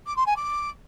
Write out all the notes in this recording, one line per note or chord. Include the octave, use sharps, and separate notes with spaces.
D6
C6
G#5
D6